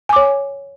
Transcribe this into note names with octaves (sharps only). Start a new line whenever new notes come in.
C#5 G#5 D6